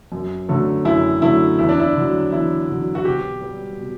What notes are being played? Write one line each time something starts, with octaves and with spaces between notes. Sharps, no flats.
F#2
D3 F#3 A3
F#2 E4
D3 F#3 A3 E4
E2 E4
D4
E4
D3 F#3
E2 E4
D3 F#3
F#4
B2 G4
G3
B2